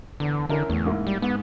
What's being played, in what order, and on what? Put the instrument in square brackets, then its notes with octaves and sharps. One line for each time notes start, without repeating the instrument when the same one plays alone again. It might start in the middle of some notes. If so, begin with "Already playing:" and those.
[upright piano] E2 [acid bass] D3
[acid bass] D3 [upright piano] C#4 E4 A#4
[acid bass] E2 [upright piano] A2
[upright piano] G#2 A#3 E4
[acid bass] G3
[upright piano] G#2 [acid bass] B3